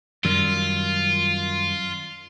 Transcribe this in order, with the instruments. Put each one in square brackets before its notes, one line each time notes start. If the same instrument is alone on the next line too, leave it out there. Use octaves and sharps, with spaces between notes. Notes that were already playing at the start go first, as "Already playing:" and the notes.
[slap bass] F#2 D#3 G3 [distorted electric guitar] F4